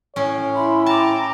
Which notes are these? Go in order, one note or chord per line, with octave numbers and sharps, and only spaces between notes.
A2 C#4 C#5
E4 B5 C6
G5 A5 A#5 D6